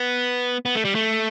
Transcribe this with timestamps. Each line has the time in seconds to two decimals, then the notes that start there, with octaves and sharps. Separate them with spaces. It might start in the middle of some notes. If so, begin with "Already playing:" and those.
Already playing: B3
0.65 B3
0.75 A3
0.85 G3
0.95 A3